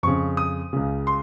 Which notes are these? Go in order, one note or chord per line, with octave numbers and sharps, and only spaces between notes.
F2 C#3 C#6
D#6
C#2 C#3
C6